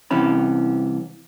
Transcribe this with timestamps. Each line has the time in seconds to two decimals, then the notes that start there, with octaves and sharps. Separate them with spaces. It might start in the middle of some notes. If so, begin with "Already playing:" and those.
0.11 C2 C3 E3 C#4 B5